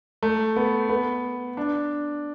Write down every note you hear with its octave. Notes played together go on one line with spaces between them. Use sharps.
A3
B3
B3
D4